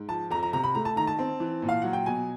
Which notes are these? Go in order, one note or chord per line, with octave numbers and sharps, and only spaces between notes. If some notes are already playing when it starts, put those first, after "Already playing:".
Already playing: G#2
F3 A5
F2 A#5
A#5
C3 A#5
B5
A3 A#5
A5
D#3 A#5
A5
C4
E3
A#2
F5
F#3 F#5
G5
B2 G#5